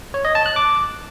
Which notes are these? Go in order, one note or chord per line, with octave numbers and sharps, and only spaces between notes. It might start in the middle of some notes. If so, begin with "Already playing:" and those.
C#5
D#5
A5
F#6
D6